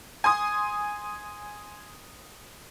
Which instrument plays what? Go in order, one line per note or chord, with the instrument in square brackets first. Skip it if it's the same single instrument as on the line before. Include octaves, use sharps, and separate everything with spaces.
[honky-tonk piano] G#5 C6 D#6